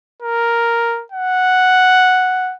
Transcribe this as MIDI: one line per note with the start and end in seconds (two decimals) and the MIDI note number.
0.23 1.03 70
1.12 2.55 78